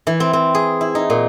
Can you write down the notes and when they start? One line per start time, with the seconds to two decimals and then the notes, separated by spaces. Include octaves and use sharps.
0.07 E3
0.20 C4
0.33 C4
0.55 G#4
0.81 E4
0.95 D#4
1.10 A#2